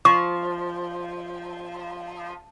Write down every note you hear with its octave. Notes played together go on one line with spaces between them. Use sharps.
F3 C#6